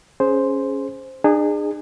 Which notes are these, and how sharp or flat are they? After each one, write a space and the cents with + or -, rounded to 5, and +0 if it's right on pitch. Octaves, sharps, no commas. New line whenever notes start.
C#4 +0 G#4 +15 C5 +0
D4 +45 G#4 -15